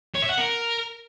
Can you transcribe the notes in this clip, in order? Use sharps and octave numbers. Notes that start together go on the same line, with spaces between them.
C#5
E5
F#5
A#4